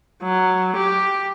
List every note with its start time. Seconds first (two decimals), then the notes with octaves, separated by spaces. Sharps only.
0.23 F#3
0.77 G4